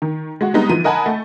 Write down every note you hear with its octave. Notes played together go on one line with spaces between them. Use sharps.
D#3
G#3 F#4
G3 G#3 B3 D#4
E3 F3 D#7
A#4 D#5 F#5 G#5 A5 B5
A3